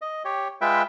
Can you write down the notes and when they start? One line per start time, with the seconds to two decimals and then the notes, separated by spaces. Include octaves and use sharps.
0.02 D#5
0.25 G4 C#5
0.61 G#3 F4 B4 E5 G5